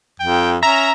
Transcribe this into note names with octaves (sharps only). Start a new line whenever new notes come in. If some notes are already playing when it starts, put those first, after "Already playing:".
F2 G5
C#4 E5 A#5